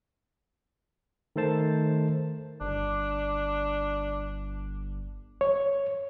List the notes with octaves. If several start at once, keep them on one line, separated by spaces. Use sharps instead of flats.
D#3 A3 A4 C5 A5
G1 D4
C#5